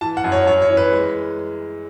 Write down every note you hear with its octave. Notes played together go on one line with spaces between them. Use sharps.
E3 A5
F#5
F#2
C#5
F#2 C#5
C#5
E3
B4
G#3